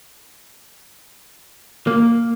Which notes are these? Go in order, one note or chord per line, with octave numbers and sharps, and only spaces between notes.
A#3